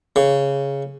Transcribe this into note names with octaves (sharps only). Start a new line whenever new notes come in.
C#3